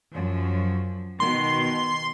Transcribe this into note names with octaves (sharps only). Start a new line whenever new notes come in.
F#2 F3
B2 D#3 C6